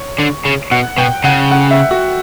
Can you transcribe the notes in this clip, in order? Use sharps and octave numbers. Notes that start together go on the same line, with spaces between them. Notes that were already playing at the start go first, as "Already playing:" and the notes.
Already playing: C#5
D3
C#3
B2 F#5
B2 G5
C#3 F#5
F#5
E5
F#4